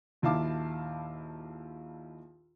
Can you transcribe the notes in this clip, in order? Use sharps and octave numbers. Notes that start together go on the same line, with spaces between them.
A#1 D#2 E4 F5 A5 D6